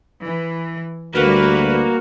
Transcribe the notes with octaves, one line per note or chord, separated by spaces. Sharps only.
E3
D2 G3 A#3 F#4 B4